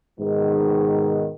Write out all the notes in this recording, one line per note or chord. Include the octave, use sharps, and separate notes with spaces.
G#2 B2 D#3